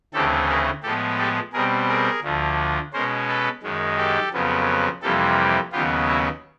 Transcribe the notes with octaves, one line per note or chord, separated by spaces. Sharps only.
D2 C#3 E3 A3 C4 G4 A4
G#4 A#4
A2 F3 G#3 B3 G4 A4
G4 A4
B2 G3 C4 G#4 A#4
G#4 A#4
D2 D3 F3
B2 G#3 C#4 A#4 C5
A4 B4
F#2 D#3 G#3
G4 A4
F2 C#3 F#3 B3
F2 C3 E3 G3 A#3 G4 A4
D#2 C#3 F#3 B3 F4 G4
E4 F#4